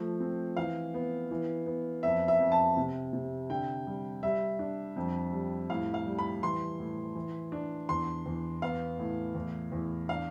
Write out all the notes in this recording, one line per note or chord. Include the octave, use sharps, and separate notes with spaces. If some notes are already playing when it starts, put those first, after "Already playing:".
Already playing: F3 A3
C4
E3 F5
B3
E3
B3
F2 E5
E5
F2
A5
C3
C3
D3 G5
G3
G3 E5
D4
F2
G3
A2 F5
F5
G3
B5
E3 C6
A2
E3
D4
E2 C6
E2
B3 F5
A2
E2
E2
D4 F5